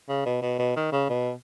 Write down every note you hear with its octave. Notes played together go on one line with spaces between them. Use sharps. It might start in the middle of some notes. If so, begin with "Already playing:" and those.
C#3
B2
B2
B2
D#3
C#3
B2